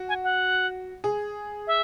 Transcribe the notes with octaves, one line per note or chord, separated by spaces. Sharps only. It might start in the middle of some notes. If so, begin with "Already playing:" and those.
Already playing: F#4
G#5
F#5
G#4
E5